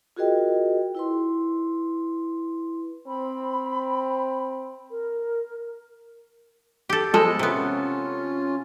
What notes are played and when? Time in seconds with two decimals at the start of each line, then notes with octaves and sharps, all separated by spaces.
0.17 F4 F#4 G#4 A#4 D#5 G5
0.95 E4 B4 C6
3.08 C4 B5
4.91 A#4
6.89 G4 A4
7.14 F3 G#3 B3 A4 D#5
7.39 C3 B3 C#4 F4